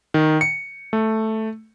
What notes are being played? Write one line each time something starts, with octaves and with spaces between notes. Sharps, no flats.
D#3
C#7
A3